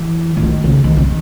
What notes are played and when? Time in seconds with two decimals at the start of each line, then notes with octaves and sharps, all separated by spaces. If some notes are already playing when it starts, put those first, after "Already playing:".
Already playing: E3
0.37 E3
0.43 D#3
0.64 C#3
0.84 D#3
0.96 C#3
1.04 D#3